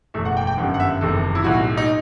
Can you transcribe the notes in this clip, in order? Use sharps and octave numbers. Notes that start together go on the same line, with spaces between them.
F#1 E2 B2 A3 E5
F#5
G5
G5
G1 F#2 D#3 G3 F#5
F#5
E5
F#1 E2 C3 D#3 A4
E4
B1 A2 G3 F#4
D#4